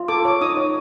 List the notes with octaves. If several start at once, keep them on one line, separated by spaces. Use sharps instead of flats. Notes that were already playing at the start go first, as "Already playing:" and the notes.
Already playing: F4
A4 D6
C#5 D6
D#4 D#6
C#5